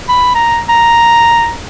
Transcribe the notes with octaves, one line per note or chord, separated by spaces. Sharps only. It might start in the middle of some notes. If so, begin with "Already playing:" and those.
B5
A#5
A#5